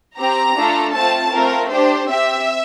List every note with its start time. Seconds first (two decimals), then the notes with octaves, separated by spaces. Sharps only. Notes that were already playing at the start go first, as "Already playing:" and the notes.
0.18 C4 G4 A#5
0.56 A3 D4 F4 A4
0.94 A3 C4 F4 A5
1.32 A3 C4 F4 A#4
1.70 D4 G4 C5
2.09 C4 G4 E5